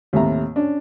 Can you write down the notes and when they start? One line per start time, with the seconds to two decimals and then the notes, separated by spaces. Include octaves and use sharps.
0.13 D#2 A2 C3 E5 A#5
0.56 C#4 D4